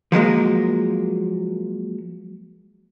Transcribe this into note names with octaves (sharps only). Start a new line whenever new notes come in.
F3 F#3 G#3 A#3